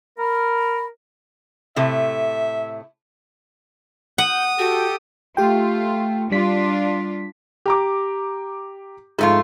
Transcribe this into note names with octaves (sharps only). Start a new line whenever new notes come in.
A#4 B5
A2 C3 A3 E5
F#5 D#6 G6
F#4 G4 A4 G5
A3 F4 G4 G5
G3 D4 F4 B6
G4 A#5 D6
F2 G#2 A3 F4